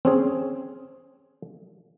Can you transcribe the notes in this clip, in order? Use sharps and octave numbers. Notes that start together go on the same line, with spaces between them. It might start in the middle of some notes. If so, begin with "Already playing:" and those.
C4 C#4 G#4